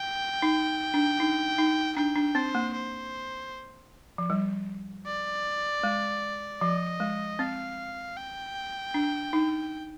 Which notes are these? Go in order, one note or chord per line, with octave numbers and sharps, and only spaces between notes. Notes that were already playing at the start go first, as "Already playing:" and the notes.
Already playing: G5
D#4
D4
D#4
D#4
D4 G5
D4
C4 C5
A#3
C5
F3
G3
D5
G#3
F3 D#5
G#3
C4 F5
G5
D4
D#4